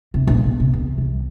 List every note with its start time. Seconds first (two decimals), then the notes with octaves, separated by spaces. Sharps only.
0.14 C3
0.27 A#1
0.44 B2
0.60 C3
0.73 E2
0.98 C2